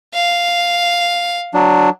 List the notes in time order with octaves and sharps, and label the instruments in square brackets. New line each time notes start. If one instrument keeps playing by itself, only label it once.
[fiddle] F5
[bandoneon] F#3 D4